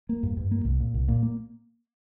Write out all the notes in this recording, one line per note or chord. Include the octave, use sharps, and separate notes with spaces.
A#3
G2
G2
A#3
C2
A#2
C2
A#2
A#3